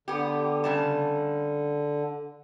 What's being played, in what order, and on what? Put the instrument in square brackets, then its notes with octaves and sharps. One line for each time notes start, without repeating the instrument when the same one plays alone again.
[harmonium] D3 [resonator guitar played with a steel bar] B3 G4
[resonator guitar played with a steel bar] C#3 G3 A5